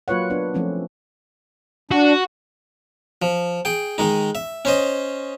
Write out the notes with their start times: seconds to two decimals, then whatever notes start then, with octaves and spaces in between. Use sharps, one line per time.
0.08 F#3 A#3 F4 B4 C#5 F#5
0.30 B3 D4
0.54 F3 A3 C4 C#4
1.91 D4 F#4
3.22 F3
3.65 G#4 G5
3.98 D#3 G#3 D#4
4.35 E5
4.65 C#4 C5 D#5